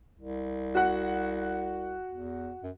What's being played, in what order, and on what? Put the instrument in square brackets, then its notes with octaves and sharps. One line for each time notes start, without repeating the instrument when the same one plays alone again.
[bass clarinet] C2
[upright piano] F#4 F#5
[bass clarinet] E2
F#2